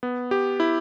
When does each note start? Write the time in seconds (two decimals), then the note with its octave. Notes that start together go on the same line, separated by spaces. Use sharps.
0.03 B3
0.31 G4
0.60 E4